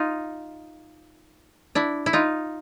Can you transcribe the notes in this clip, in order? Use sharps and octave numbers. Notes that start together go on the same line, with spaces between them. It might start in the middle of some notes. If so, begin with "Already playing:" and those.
Already playing: D#4 F4
D4 E4
E4
D#4 F4